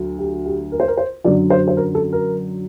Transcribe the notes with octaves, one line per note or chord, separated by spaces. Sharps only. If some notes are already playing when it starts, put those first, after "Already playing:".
Already playing: D2 F#3
G4
G4
A#4
C5
A#4
C5
F#2 D3 F#3 D5
C5
C5
A#4
A4
A#4